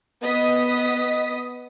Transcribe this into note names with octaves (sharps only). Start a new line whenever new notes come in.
B3 D#5 D#6 B6